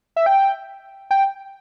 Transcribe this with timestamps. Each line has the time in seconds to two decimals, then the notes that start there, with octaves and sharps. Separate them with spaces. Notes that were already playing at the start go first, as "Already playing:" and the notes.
0.16 E5
0.26 G5
1.11 G5